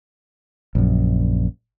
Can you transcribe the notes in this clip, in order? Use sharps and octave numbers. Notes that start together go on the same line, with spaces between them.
A#1 F#2